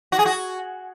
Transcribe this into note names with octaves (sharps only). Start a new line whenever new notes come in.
F#4
G#4
F#4